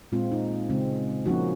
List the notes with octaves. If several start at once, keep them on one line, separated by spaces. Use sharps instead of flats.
A#2 G#3 C4 F4
D#4
C#3 G#3 C4
F3 A#3 C#4 D#4 F#4